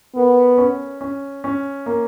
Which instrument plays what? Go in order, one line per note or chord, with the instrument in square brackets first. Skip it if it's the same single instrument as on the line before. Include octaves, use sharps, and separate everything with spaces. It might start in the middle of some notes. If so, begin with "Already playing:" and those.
[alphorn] B3 [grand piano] A#4
[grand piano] C#4
C#4
C#4
A#3